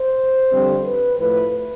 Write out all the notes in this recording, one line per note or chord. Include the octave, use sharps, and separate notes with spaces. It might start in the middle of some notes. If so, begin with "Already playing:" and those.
Already playing: C5
F2 D3 G3 C4
B4
A2 F3 A3 B4